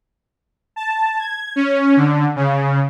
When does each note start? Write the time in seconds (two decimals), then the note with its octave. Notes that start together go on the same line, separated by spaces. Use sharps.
0.76 A5
1.19 G#6
1.56 C#4
1.97 D3
2.36 C#3